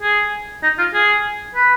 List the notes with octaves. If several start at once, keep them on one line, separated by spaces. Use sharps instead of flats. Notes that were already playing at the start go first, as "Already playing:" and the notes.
G#4
D#4
F4
G#4
B4